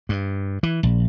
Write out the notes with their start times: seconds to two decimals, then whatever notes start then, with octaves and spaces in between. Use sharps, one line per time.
0.09 G2
0.63 E3
0.83 A#1